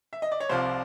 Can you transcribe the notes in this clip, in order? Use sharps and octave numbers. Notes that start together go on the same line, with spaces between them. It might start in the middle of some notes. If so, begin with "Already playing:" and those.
E5
D#5
D5
C#5
C2 C3 F3 C5